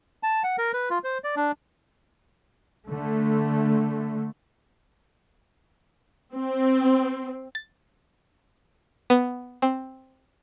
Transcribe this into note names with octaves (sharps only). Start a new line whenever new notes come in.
A5
F#5
A#4
B4
F4
C5
D5
D4
D3 A3
C4
A6
B3
C4